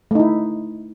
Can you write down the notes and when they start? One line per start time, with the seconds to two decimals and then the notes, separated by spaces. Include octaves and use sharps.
0.11 A3
0.15 D#4
0.20 E4